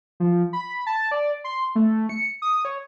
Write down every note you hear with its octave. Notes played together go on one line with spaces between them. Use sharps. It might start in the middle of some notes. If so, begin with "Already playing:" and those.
F3
B5
A5
D5
C6
A3
C#7
D#6
C#5